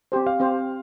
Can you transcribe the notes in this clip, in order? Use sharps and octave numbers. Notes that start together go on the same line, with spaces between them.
C4 G4 C5
F5
C4 G4 C5